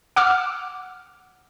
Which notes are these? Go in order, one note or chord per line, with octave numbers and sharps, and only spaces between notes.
F#5 D6 E6 F6